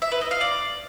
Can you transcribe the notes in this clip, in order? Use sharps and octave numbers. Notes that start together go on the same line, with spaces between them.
E5
B4
D#5
F5
D5